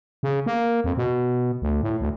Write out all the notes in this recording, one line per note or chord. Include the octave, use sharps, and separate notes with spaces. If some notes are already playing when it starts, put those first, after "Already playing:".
C#3
A#3
F2
B2
D2
A2
D2